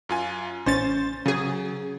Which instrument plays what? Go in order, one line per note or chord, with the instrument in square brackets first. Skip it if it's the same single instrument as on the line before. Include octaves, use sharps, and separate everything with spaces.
[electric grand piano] F#2 F4 G#5
[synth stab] A1 C#4 A6 [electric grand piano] C5
[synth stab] C#3 G#4 [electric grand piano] F#3